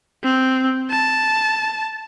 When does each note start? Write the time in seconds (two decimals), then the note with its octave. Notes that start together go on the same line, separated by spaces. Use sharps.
0.23 C4
0.90 A5